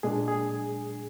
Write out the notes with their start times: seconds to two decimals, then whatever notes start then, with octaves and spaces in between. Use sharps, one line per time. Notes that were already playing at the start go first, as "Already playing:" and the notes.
0.03 A#2 G#3 D4 G#4
0.28 G#4